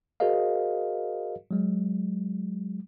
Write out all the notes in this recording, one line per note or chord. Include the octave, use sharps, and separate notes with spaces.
F#4 G#4 A#4 C5 D#5 F5
F#3 G#3